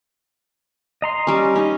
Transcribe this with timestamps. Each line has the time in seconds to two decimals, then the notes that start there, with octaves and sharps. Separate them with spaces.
1.02 D#5 A#5 C6
1.27 G3 C#4
1.55 C#4 D#4